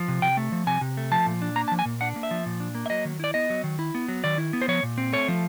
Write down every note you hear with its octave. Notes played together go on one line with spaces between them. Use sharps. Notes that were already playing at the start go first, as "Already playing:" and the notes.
Already playing: F3
C3
C3 G5
A3
F3
C3 G#5
C3
A3
F3 A5
A#2
D4
A#3 A#5
A5
F3
G#5
A#2
D4 F#5
A#3
E5
F3
A#2
D4
A#3
E5
F#3 D#5
D#3
E4 D5
B3 D#5
F#3
D#3
E4
B3
F#3
D#3 D5
E4
B3
C5
F3 C#5
A#2
C4
A3 C#5
F3